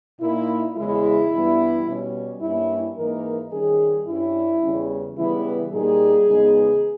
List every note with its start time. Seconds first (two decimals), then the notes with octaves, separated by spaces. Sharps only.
0.21 A#2 A#3 D#4 E4
0.77 E2 C#3 G#3 E4
1.32 G2 E3 G3 B3
1.87 B2 G3 C#4
2.42 G2 G3 A#3 C#4 E4
2.96 G#2 E3 A#3 D#4 A#4
3.51 D#3 G3 C#4 G#4
4.07 G2 G3 C#4 E4
4.62 E2 C#3 G3 C#4
5.16 C#3 E3 G3 B3 E4
5.72 A#2 G3 A#3 D#4 G#4
6.27 E2 C#3 G#3 B3 D#4